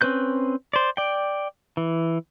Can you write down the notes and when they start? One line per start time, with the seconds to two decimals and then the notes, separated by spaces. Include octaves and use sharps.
0.01 C4 C#4 B4 F#6 G6
0.73 C5 D5
0.97 D5 G5
1.77 E3